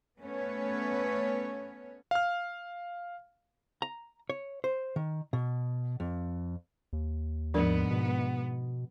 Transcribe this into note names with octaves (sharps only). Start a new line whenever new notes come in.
A3 B3 C#4 B4 C#5
F5 F6
A#5
C#5
C5
D#3
B2
F2
D#2
G#2 F3 B3 D4 A#4
B2